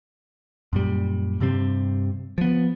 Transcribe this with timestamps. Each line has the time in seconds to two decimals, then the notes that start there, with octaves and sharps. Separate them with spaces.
0.73 F#2 A#2 G3
1.40 G2 C3 G3 C4
2.38 F3 B3